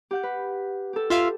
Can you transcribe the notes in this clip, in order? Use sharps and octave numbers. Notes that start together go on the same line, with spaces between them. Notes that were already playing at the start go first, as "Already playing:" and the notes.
G4 F#5 G6
B4
G4 A4
F4 E5 F5